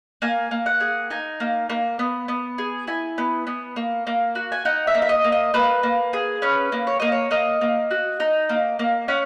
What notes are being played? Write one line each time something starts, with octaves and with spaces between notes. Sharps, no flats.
A#3 G#5
A#3
F#5
G#4
D#4 G#5
A#3
A#3
B3
B3
G#4
E4 G#5
B3
B3
A#3
A#3
F#4
G#5
D#4 F#5
E5
A#3
E5
D#5
A#3
D#5
A#3 B4
A#3
G#4
C#4 B4
A#3
C#5
A#3 D#5
C#5
A#3 D#5
A#3
F#4
D#4
A#3
A#3
C#4 F#5